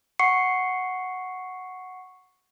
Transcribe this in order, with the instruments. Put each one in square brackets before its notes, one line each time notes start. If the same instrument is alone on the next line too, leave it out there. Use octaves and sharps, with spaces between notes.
[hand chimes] F#5 C#6 C7 C#7